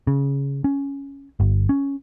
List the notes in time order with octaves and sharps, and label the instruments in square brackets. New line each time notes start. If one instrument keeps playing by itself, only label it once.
[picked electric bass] C#3
C#4
G1
C#4